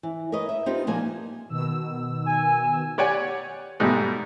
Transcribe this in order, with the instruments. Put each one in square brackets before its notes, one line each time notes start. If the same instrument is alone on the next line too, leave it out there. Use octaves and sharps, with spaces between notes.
[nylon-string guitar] E3
A#4 B4 C#5 D#5
E5
B3 C4 D4 D#4 F4 G4
A#2 F3 A#3 G#5
[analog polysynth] B2 D#3 E6
[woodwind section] G#5
[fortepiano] G4 C#5 D5 F#5 G#5
G#2 B2 G3 A3